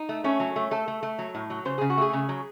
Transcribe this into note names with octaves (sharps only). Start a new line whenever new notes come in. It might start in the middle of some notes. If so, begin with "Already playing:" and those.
Already playing: D#4
A3
A3 C#4
F#3
A3
A3 A4
A3
A3
F#3
A2
F#3
C#3 C5
C#3 G#4
F#4
A3 G#4
C#3
F#3